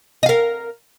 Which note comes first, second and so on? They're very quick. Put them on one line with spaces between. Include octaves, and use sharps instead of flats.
D#5 F5 A#4